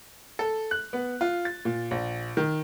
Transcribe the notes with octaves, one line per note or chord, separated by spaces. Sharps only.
A4
F#6
B3
F4
A6
A#2
A#1
D#3